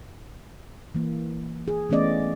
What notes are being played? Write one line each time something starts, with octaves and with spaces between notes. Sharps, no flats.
E3 A#3
G#4
E3 A3 B3 C#4 D5 D#5